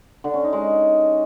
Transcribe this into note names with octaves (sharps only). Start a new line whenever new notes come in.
D3
C#4
D#4
G#3